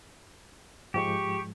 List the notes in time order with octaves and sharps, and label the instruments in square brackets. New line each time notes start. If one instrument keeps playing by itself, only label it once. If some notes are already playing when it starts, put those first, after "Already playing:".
[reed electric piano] G#2 F3 G#3 [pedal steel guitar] G4 [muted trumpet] C#6